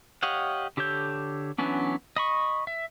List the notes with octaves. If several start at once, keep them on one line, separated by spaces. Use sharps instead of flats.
G4 C#5 D#5 F5 F#5
D3 G4 A4 C#5 G6
E3 F#3 B3 C#4 D4
D#5 B5 C#6
E5